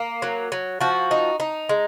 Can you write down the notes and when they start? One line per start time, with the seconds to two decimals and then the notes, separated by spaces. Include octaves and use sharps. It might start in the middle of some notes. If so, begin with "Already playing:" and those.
Already playing: A#3
0.22 F#3
0.52 F#3
0.81 F3 F#4
1.11 D#4
1.40 D#4
1.69 G#3